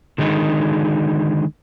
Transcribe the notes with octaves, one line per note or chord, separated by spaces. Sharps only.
D3 D#3 G#3 D#4